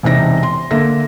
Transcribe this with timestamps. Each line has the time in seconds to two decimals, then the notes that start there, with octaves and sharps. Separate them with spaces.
0.03 E1 C3 D#4 A#6
0.43 C6
0.71 D3 A#3 A4 E5 A#6